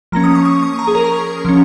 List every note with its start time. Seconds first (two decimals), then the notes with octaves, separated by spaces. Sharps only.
0.12 F3 A#3 C#4 A#5
0.24 D#6
0.35 C#6
0.45 D#6
0.63 C#6
0.79 A#5
0.87 G#4
0.95 A#4
1.04 A#5
1.45 F3 C#4